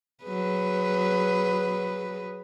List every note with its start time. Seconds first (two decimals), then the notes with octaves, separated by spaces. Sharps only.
0.24 F#3 G#4 B4